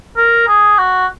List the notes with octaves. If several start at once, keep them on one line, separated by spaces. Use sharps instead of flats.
A#4
G#4
F#4